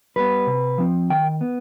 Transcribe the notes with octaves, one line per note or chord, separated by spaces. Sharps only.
G3 B3 B4
C3
F3 C4
D#3 G5
B3